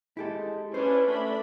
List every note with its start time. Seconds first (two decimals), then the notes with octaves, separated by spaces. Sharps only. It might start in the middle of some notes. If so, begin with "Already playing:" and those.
0.17 G#3 E4 G4 A4
0.74 C#4 D4 E4 B4 C5
1.08 A3 D4 B5